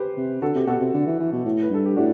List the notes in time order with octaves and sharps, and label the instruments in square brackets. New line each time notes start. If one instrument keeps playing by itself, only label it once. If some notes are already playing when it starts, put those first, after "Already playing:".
Already playing: [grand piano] G4 B4 C5
[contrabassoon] C3
[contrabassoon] D3 [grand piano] F#4 A4
[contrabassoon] C3 [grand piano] G4
[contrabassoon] B2 [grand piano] F#4 A4
[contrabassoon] C3
D3
E3
E3
B2
A2
[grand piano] B4
[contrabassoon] G2 [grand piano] A4
[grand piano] G4
[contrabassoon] A2 [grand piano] D4 F#4